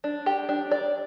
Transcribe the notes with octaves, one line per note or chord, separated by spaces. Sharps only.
D4
G4
D4
D5